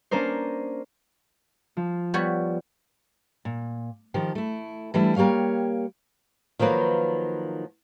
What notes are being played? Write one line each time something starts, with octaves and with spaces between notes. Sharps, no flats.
A#3 C#4 D4 A#4 C5
F3
G3 B3 C#5
A#2
D#3 F3 G4
A3 E4
E3 G3 A3 D4 E4
G3 A#3 G4 C#5 F5
D#3 F3 F#3 A#3 B4